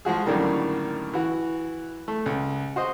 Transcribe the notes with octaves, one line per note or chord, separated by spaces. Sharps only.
F3 G#3 F#4 G#4
F#2 A2 D3 D#3 G3 A#3
E3 F#4
A3
C#2
F#4 C5 D#5